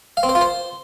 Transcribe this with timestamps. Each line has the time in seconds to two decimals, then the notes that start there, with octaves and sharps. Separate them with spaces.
0.17 F5
0.23 C4
0.29 C5
0.35 F4
0.41 C5